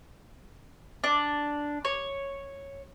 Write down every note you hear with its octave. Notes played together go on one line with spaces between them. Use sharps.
D4
C#5